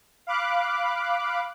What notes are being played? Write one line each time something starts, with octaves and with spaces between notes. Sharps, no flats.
F5 B5 D6 F#6